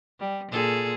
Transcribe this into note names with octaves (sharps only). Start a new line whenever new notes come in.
G3
A#2 G#4 A4